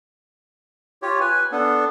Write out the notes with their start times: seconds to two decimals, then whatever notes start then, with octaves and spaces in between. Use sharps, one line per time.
1.02 F4 G4 C#5
1.20 B4 G#5
1.52 B3 D4 A4